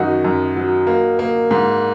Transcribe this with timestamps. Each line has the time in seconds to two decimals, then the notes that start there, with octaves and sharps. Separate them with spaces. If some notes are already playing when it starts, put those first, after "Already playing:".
Already playing: F#2 D#3 D#4 F#4
0.24 F#2
0.56 F#3
0.87 A#3
1.19 A#3
1.51 G#2